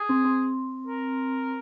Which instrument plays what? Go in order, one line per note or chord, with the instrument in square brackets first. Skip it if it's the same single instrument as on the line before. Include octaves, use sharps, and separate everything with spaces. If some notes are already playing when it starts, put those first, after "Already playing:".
Already playing: [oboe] G#4
[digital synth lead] C4
C4
[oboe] A#4